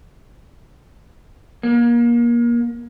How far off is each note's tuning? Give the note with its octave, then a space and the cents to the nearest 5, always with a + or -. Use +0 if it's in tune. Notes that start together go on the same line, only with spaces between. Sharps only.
A#3 +25